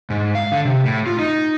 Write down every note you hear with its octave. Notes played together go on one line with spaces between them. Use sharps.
G#2
F5
D3
C3
A2
F4
D#4